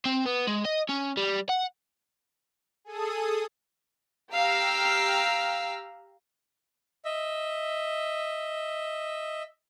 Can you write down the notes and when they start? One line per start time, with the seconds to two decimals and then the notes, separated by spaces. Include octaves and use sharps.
0.05 C4
0.26 B3
0.47 G#3
0.65 D#5
0.89 C#4
1.17 G3
1.50 F#5
2.85 G#4 A4 D#6
4.33 G4 F5 A#5 E6 F6
7.04 D#5 E5